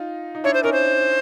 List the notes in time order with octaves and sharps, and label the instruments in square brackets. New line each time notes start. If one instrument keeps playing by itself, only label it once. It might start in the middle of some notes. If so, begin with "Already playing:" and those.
Already playing: [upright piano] D#4 F4
D#4
[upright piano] D4 E4 [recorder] C#5
[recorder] C5
[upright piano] C#4 D#4 [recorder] A#4
[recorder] C5